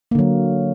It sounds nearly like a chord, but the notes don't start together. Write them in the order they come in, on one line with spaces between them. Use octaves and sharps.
A#3 D3 F#3